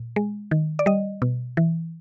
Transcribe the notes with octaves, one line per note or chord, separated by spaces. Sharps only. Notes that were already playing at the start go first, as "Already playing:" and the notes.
Already playing: A#2
G#3
D#3
D5
G3 D#5
B2
E3